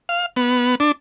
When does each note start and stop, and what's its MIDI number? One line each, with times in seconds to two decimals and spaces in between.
0.09 0.26 77
0.36 0.75 59
0.80 0.92 62